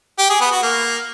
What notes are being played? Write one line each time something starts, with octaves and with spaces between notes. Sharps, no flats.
G4
G#4
B3
F#4
A#3